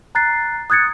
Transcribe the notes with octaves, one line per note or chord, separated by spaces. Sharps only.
A#5 F#6 A6 C7
D#6 F#6 G#6 A6 C#7